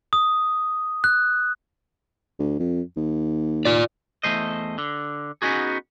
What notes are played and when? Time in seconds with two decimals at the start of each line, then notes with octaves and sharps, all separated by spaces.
0.13 D#6
1.04 F#6
2.39 D2
2.59 F2
2.96 D#2
3.65 F4 D5
4.23 E2 G2 E3 A3 C5 D#5
4.78 D3
5.42 B3 C#4 D#4 F#4 G#4